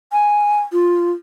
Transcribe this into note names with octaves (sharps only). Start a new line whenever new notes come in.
G#5
F4